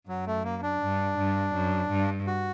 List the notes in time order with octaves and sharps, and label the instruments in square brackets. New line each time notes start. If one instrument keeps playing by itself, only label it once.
[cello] F#2 [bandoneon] F#3
[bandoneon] A3
A#3
D4
[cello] G2
G2
F#2
G2
[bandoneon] F#4